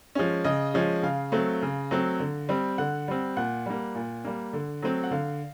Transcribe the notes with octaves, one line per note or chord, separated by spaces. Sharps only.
F3 G#3 C#4
C#3 D#5
F3 G#3 C#4
C#3 F5
F#3 A3 C4
C#3
F#3 A3 C4
D3
G3 C4
D3 F#5
G3 C4
A#2 F#5
G3 A#3
A#2
G3 A#3
D3
F#3 A3 C4
F#5
D3 F5